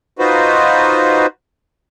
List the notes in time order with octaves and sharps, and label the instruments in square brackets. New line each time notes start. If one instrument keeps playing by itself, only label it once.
[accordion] D#4 F4 F#4 B4 C5